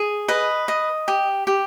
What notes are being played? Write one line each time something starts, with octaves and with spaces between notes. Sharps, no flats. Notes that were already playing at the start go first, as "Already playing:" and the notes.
Already playing: G#4
B4 D#5
D#5
G4
G4